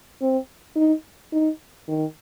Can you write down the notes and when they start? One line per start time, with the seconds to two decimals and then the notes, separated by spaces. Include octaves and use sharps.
0.21 C4
0.76 D#4
1.33 D#4
1.88 D#3